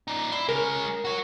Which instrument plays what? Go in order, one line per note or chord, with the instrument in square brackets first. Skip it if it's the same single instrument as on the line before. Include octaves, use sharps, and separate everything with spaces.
[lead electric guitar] D#4 D5
[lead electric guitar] E4 [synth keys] C6
[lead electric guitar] G#3 C#4 [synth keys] A#4
[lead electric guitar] F#4 C#5